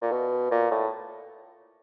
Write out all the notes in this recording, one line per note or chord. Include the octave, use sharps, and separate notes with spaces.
A#2
B2
A#2
A2